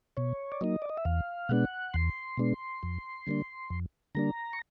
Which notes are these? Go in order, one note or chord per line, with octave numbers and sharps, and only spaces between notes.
B2 C#5
D5
F#3 A#3 D#4 D#5
D5
D#5
E5
E2 F5
B2 G#3 B3 D4 F#5
E2 C6
B2 G#3 B3 D4
F2
D3 G3 A#3 D4
F2
D3 G3 A#3 D4 A#5
C#6